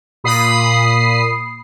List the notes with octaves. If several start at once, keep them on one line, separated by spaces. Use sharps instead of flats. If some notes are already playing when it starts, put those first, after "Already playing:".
A#2 B5 D#6 C7